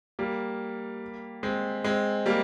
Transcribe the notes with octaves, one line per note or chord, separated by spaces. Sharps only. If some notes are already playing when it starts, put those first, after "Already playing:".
G3 A#3
G#3 C4
G#3 C4
G3 A#3